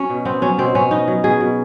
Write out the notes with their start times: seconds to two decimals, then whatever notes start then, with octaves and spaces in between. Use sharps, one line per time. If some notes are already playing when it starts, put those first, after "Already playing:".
Already playing: F#3 C#4
0.10 B2
0.25 B3 C4
0.42 F#3 C#4
0.58 B2 C4
0.75 B2 C#4
0.91 B3 D#4
1.08 F#3
1.24 B2 G#4
1.41 B2